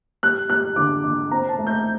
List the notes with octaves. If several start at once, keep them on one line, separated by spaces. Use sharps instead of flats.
G3 F#6
G3 F#6
D3 D6
D3
C4 A#5
A5
A3
G6